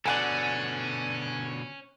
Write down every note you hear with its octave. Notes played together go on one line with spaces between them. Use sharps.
B2 D3 C#4 A4 D5 F#5 G#5